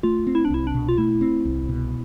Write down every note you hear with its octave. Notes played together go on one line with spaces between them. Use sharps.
A3 F4
C4
E4
D4
C2 E4
D4
B2
F4
A3 E4
C4
C2
B2